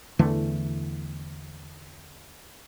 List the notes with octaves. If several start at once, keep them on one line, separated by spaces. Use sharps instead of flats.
E2 D3 E3 A3